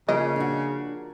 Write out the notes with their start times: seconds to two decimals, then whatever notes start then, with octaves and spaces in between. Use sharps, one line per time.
0.09 C#3 F3 A#3 D#5
0.36 D4 F#4